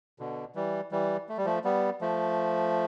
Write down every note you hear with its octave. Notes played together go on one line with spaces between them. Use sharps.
B2 D3
E3 G3
E3 G3
A3
G3
F3 A3
G3 B3
F3 A3